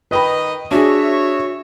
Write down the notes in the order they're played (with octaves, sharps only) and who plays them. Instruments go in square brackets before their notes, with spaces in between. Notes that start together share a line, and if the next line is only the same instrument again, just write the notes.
[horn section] D#3 D#5 [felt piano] B4 G5 B5
[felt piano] D4 G#4 [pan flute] F#4 [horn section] C#5 E5